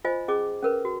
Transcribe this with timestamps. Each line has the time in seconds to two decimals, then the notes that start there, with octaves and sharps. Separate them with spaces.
0.05 F4 C5 D#5 G#5
0.28 C#4 G#4 D#5 D6
0.63 C#4 A#4 B4
0.85 F#4